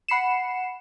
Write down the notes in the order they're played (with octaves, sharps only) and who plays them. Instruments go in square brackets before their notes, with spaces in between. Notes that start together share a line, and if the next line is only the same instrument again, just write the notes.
[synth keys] F#5 B5 C7 C#7 E7